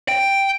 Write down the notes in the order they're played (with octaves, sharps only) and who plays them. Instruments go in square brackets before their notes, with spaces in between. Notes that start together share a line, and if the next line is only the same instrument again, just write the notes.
[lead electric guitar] G5